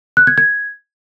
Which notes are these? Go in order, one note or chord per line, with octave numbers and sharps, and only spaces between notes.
F#6
G#6
G#6